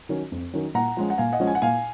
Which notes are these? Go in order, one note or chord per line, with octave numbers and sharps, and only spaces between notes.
D#3 F#3 C#4
F2
D#3 F#3 C#4
A#2 F#5 A#5
F3 G#3 C#4
F#5
A#2 F5 G#5
D#5 F#5
F3 G#3 C#4
G#5
F#5
A#2 F5 G#5